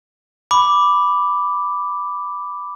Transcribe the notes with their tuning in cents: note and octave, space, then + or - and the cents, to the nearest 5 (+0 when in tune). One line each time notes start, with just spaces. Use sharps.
B5 +0 D6 +0